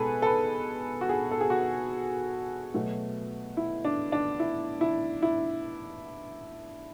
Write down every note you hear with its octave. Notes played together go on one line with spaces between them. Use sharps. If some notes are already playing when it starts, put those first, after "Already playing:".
Already playing: B2 G#3 G#4 A4 B4
A4
B4
F#4
G#4
A4
G#4
F#4
B2 F#3 A3
E4
D4
D4
E4
E4
E4